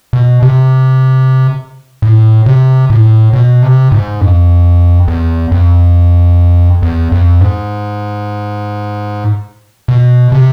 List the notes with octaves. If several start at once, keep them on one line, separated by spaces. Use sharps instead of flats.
B2
C3
A2
C3
A2
B2
C3
G#2
F2
E2
F2
E2
F2
G#2
B2
C3